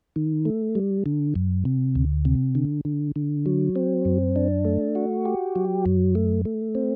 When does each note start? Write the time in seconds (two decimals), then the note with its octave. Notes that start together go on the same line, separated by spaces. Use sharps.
0.16 D#3
0.45 A3
0.75 G3
1.06 D3
1.35 F#2
1.65 C3
1.95 D2
2.25 C3
2.55 D3
2.85 D3
3.16 D3
3.46 F#3
3.76 C4
4.05 F#2
4.36 D4
4.65 A3
4.95 F#4
5.25 G4
5.56 F#3
5.86 F#2
6.15 A3
6.45 A3
6.75 C4